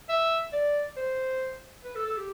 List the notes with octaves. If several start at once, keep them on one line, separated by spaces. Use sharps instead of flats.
E5
D5
C5
B4
A4
A4
G4